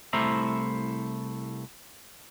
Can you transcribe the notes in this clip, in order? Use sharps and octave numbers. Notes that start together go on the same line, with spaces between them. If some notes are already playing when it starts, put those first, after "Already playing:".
C2 A3 E4 C5 E5 A#5